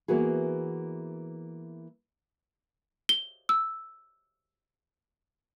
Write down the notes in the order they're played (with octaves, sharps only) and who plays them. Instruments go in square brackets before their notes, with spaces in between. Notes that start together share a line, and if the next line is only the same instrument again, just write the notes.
[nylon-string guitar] E3 A#3 B3 F#4 G#4
[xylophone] G7
E6